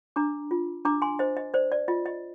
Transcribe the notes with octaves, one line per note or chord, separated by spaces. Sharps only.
D4 A#5 D6
F4
D4 A#5 D6
G#5 C6
C5 D#5
D#5
C5 D5
D5
F4 D#5
D#5